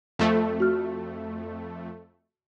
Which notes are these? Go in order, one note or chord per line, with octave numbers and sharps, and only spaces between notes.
F2 A3
F#4 F6